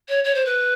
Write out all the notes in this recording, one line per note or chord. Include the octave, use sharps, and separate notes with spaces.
C#5
C#5
C5
B4